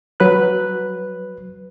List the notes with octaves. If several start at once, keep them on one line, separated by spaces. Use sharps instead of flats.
F#3 B4 F#6